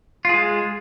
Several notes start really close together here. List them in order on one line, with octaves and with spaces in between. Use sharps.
F4 G#4 G#3